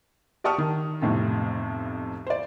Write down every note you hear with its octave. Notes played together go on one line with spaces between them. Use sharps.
G4 D5 A5 C#6 D#6 F6
D#3
B1 F2 A2 C3
C5 D5